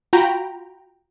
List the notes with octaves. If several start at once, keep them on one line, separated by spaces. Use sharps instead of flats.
F4 F#4 G5 A#5 B5